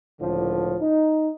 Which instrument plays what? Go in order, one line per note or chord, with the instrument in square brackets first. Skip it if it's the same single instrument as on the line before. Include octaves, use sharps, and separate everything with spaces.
[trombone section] C#2 A2 D3 F3
D#4